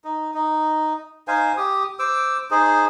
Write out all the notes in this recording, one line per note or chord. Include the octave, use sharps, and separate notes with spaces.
D#4
D#4
D#4 C5 F5 G#5
G4 D#6
C5 D6 E6
D#4 G#4 C5